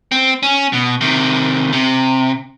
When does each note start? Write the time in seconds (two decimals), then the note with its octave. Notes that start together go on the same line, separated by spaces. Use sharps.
0.12 C4
0.43 C#4
0.73 B2
1.01 C3 D#3
1.73 C3